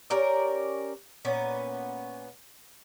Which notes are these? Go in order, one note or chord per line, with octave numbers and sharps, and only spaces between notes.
C#4 G4 A#4 D5
A#2 B3 C#4